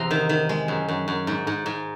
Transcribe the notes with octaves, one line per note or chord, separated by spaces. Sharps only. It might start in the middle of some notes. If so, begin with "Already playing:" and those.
Already playing: E2 C3 A#5 C6
D#3
D#3
G#3
F#2
F#2
F#2
G#2
G#2
G#2